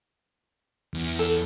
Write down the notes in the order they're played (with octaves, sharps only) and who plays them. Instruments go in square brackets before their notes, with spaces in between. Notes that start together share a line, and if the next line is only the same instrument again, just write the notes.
[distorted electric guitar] E2
[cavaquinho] A4